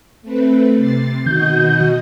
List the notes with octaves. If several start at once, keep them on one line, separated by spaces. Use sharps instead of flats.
A3 C4 B4
C3 A6 C7
B2 D#3 F#4 D#5 G6